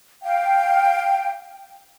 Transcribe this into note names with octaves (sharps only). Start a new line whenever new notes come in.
F5 G5